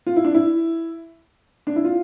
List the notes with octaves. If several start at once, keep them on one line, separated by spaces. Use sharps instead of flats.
F4
E4
D4
E4
D4
E4
F4